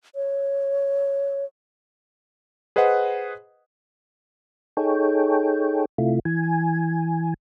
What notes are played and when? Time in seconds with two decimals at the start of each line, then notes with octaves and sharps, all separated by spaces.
0.15 C#5
2.76 G#4 B4 C5 D#5 F#5
4.77 D#4 G#4 A4 C#5 G5
5.98 C3 A3 E4 F4
6.25 E3 G#5